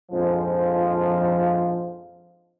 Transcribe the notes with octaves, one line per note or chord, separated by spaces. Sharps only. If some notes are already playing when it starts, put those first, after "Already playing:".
A#1 F2 G#2 F3